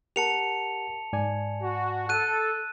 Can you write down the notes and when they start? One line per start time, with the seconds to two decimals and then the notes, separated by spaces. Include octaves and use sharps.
0.16 G4 A#4 F#5 A5 C#7 F7
1.13 G#2 D5 G#5
1.61 F#4
2.09 A4 F#6 D#7